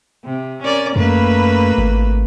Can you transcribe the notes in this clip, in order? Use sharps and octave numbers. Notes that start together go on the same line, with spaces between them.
C3
C#4 A#4 D5
F#2 A3 A#3 B4
G#1